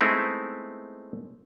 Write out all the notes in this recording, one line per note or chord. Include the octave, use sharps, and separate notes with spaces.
G#3 A3 B3 C4 D#4 E4